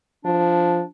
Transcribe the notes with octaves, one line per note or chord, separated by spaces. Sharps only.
F3 D4